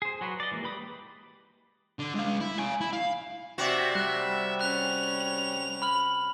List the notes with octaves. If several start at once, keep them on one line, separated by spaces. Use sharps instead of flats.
G#4 C5
F#3 F#4 B4
D5 D#5
E3 G#3 A#3
G4 B4 B5 D6 D#6
D3
G#3 F5
E4
F5 G#5
E4
F5
C3 F#4 D5 E5
G3 E5 F#6
C#4 F#6 F7
B5 F6 F#7